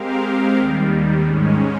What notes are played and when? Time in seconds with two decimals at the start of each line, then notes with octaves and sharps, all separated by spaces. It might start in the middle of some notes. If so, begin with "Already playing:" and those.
Already playing: G#3 C4 G4 A#4 F5
0.55 D#2 D#3 G3
1.24 G#2 D#3 G#3 C#4